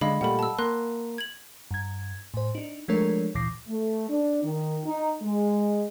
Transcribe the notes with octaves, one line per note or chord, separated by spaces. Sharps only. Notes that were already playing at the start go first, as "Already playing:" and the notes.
D3 G#3 D#5 F5 B5
A#2 G3 A3 F#5 B5
A5 E6
A#3 C6 F#6
G#6 F#7
G2 G#6
A2 C5
D4 D#4
F3 G#3 A3 D4 A#4 C#5
D2 A#2 E3 D6 A#6 C7
A3
D4
D#3
D#4
G#3